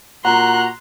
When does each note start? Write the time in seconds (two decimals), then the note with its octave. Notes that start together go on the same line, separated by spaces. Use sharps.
0.25 A#2 F#4 A#5 C6 F#6